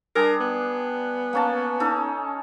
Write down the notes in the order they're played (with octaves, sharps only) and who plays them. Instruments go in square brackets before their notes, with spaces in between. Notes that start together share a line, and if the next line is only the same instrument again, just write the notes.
[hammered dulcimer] G3 D4 G#4 [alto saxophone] A#4
[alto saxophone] B3
[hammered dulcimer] A#3 C#4 A5
C#4 D#4 A4